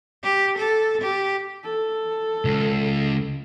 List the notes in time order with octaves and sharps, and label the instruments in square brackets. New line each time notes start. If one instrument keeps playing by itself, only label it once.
[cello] G4
A4
G4
[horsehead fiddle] A4
[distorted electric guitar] C#2